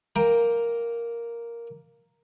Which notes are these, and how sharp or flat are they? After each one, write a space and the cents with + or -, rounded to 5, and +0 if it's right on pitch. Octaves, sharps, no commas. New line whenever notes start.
A#3 +0 G5 +15 A#5 +0